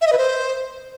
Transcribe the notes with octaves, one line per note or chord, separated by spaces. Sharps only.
E5
D#5
B4
C5